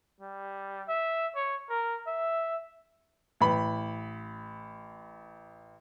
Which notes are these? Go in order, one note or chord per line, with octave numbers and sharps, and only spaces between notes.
G3
E5
C#5
A#4
E5
A1 B5